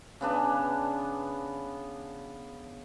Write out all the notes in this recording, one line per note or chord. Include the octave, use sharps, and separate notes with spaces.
C#3 B3 D4